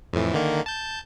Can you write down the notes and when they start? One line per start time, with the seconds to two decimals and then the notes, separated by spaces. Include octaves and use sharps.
0.13 F2 A2 E3
0.33 D3 D#3 A#3
0.66 A5 G6